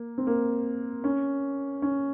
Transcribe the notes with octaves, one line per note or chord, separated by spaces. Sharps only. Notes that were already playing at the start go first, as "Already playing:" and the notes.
Already playing: A#3
C4
A#3
C#4
C#4